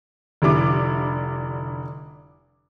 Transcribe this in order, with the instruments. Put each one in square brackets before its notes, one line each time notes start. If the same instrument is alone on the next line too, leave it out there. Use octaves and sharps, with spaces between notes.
[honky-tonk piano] F1 D3 G3 E4 D6